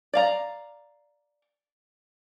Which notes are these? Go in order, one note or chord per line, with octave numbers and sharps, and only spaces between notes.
D5 F5 A#5